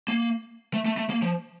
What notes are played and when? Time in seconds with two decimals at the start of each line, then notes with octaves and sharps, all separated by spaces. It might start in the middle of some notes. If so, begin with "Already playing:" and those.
0.08 A#3
0.74 A3
0.86 A3
0.97 A3
1.10 A#3
1.22 F3